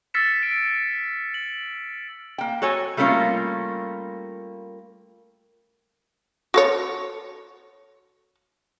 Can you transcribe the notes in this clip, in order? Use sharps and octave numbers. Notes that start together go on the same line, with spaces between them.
E6 F6 A6 B6 C#7 E7
D7
F#7
A#3 G5
F#4 A4 C#5 G#5
G3 A3 A#3 C#4 F4 A#4
F#4 A4 C#5